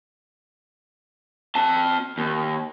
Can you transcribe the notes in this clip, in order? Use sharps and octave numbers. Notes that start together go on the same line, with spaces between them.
C4 A5
D#2